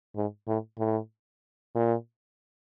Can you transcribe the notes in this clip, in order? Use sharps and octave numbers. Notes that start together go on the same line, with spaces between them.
G#2
A2
A2
A#2